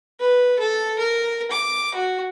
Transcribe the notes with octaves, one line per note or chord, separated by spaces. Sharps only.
B4
A4
A#4
D6
F#4